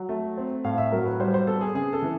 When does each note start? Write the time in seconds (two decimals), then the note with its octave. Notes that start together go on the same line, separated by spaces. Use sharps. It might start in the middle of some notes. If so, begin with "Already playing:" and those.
Already playing: F#3
0.09 A3
0.37 C4
0.64 A2 F5
0.78 E5
0.92 F#3 A#4
1.05 B4
1.20 G3 C5
1.34 C5
1.47 B3 A4
1.61 G#4
1.75 C#3 G#4
1.93 A4
2.02 E3